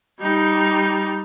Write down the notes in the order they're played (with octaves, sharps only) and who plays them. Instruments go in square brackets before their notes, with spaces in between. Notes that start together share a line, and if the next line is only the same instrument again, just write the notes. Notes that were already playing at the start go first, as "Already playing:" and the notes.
[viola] G3 D#4